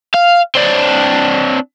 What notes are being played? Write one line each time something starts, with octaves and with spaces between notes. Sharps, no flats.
F5
C4 D4